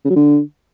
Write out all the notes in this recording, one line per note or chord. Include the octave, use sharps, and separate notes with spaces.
C#3
F#3
D3